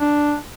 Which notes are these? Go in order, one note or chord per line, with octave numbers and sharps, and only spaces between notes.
D4